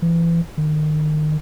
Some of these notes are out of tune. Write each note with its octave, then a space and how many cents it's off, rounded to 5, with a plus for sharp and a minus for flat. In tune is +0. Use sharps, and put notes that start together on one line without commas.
E3 +30
D#3 -30